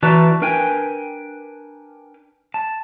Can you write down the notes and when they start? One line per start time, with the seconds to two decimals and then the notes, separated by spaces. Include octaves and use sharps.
0.03 E3 F#4 B4 D5 A5 A#5
0.42 D4 A#4 B4 G5 G#5
2.54 A5